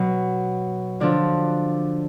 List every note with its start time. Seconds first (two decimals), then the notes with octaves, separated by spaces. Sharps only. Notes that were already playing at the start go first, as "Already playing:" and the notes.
Already playing: B2 F#3
1.00 D3 F3 D4